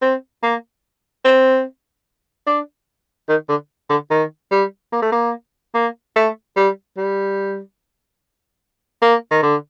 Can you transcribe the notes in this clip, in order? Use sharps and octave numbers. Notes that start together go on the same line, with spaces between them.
C4
A#3
C4
D4
D#3
D3
D3
D#3
G3
A#3
A3
A#3
A#3
A3
G3
G3
A#3
D#3
D3